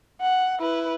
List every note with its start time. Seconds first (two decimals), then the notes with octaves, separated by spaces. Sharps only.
0.22 F#5
0.60 E4 B4